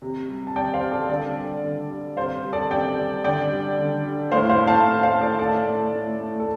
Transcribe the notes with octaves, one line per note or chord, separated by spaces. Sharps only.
C3
G3
A5
C3 D5 G5
C5 F5
G3
A4 D5
D3 A4 D5
G3
D3
G3
C3 C5 F5
G3
A4 D5
C3 D5 G5
G3
D3 D5 G5
G3
D3
G3
A2 C5 F5
C5 F5
A3
F5 A5
A2
C5 F5
A3
A4 D5
A2 A4 D5
A3
A2
A3
A4